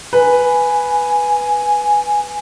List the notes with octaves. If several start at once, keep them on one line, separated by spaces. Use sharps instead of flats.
B4 G#5